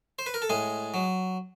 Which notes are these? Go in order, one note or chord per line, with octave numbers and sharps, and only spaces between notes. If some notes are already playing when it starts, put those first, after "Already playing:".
C5
B4
A#4
A4
A2 G#3 G#4
F#3